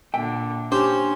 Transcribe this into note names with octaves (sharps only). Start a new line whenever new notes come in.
A#2 D3 E5 G5
C#4 D4 G4 C5